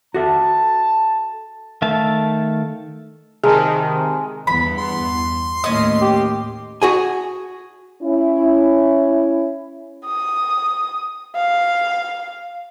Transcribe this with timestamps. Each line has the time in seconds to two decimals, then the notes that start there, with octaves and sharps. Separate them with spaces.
0.14 F#4 A4 E5 A5
1.82 D#3 A3 E5 F5 A5
3.44 C3 D#3 G#3 G#4 A5 A#5 F6
4.47 E2 G2 B3 B5
4.78 C6
5.64 D#2 A2 C#4 D#5
6.01 G4
6.82 F#4 G#4 G#5
8.02 C#4 E4
10.06 D#6
11.36 F5